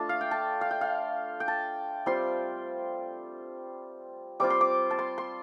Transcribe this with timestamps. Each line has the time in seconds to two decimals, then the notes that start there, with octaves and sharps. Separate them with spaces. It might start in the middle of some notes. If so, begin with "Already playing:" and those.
Already playing: A3 D4 F4 A5
0.09 F5
0.21 G5
0.31 A5
0.61 F5
0.71 G5
0.81 F5
1.40 G5
1.48 A5
2.06 G3 C4 F4 C6
4.40 G3 C4 F4 D6
4.50 C6
4.61 D6
4.91 A5
4.99 C6
5.18 C6